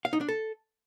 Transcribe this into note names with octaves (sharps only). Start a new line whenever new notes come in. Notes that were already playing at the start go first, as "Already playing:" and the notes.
F5
D#4
D4
A4